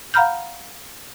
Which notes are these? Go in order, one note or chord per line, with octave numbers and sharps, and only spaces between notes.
F5 F#5 A#5 B5 F6 G6